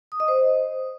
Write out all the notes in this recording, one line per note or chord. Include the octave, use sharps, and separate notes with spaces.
D#6
D#5
C5